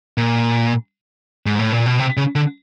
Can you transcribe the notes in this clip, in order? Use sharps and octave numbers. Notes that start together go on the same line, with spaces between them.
A#2
G#2
A2
A#2
B2
C3
C#3
D3